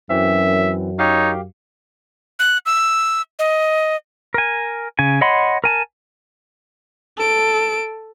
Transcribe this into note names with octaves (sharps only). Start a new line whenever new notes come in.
F#2 E3 C4 E5
D#4 G4 C#5 F5
F#6
E6
D#5
A#4 G#5
C#3 G#5
C#5 D#5 F#5 B5 C6
A#4 G#5 A5
A4 D7